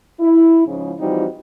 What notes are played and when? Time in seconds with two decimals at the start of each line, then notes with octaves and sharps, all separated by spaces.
0.20 E4
0.66 G#2 C#3 F3
0.99 E3 F3 G3 C4 D#4 F#4